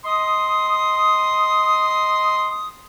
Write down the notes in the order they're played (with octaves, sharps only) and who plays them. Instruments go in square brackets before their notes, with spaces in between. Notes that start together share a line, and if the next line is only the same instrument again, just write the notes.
[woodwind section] D#5 C6 D#6